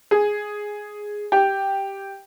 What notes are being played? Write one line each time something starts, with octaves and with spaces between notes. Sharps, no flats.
G#4
G4